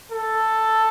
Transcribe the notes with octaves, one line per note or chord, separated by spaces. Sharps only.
A4